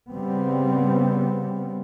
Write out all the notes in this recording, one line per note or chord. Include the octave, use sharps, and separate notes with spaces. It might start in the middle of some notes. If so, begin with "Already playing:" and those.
C#3 G3 B3 C4